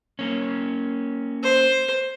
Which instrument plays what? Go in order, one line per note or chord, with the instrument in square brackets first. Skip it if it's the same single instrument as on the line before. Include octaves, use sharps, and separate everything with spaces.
[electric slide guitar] A#3 C#4
[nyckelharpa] C5